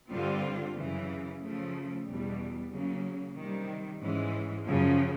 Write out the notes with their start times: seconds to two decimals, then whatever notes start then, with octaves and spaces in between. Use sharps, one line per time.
0.11 G2 D3 G3 C4 F4
0.75 F#2 C#3 E3
1.41 C#3 F3 A3
2.06 E2 B2 G3
2.71 C#3 F#3 A#3 C#4
3.35 C3 D#3 G3
4.01 G#2 E3 G#3 C#4
4.66 F#2 C#3 F3